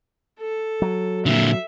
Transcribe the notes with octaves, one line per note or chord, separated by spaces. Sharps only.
A4
F#3
A#2 D3 E5